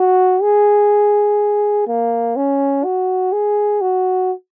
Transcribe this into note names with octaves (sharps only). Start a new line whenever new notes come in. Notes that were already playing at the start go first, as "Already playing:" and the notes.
Already playing: F#4
G#4
A#3
C#4
F#4
G#4
F#4